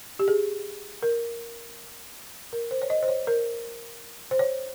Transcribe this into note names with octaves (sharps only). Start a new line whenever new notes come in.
G4
G#4
A#4
A#4
C5
C#5
D#5
C5
C#5
A#4
C5
C#5